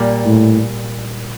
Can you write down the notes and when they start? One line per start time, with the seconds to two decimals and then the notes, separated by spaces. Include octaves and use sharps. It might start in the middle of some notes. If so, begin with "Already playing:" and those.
Already playing: A#2 G3 A#3
0.25 A2